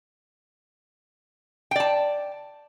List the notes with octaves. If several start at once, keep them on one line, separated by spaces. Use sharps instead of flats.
D5 G5 A5